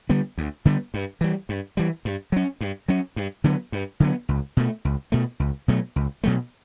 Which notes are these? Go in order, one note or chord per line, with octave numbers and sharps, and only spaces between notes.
D3 G3 B3
D2
D3 G3 B3
G2
E3 G3
G2
E3 G3
G2
F#3 C#4
G2
F#3 C#4
G2
D3 F#3 B3
G2
D3 F#3 B3
C#2
B2 A3
C#2
B2 A3
C#2
B2 F#3 A3
C#2
B2 F#3 A3